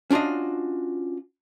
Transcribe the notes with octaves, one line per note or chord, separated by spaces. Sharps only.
C#4 D4 F4 F#4 D#5